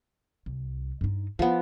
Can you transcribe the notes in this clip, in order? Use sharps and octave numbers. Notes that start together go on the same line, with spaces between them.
C2
G2 D#4
F3 B3 D4 E4